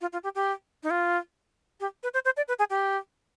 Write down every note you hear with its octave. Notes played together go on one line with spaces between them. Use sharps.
F4
F4
G4
G4
D#4
F4
G4
B4
C5
C5
D5
B4
G#4
G4